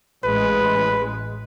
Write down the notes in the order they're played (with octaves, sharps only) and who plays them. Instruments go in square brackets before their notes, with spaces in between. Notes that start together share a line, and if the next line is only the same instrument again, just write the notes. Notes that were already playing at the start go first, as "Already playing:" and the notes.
[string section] A1 G#3 [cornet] B4